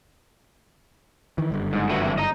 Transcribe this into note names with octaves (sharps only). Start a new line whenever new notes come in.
D#3 E3
F#1 G2 D3
G#2
A3 F#4 B4
A2 C3 E3
D#5 A#5